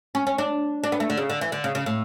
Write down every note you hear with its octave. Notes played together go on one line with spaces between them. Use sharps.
C#4
C#4
D4
D4
B3
A3
D3
C#3
D3
E3
D3
C#3
C#3
A2